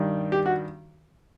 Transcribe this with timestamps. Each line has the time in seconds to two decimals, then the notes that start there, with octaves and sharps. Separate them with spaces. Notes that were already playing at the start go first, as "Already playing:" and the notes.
Already playing: G2 D#3 G3
0.32 G4
0.46 F#4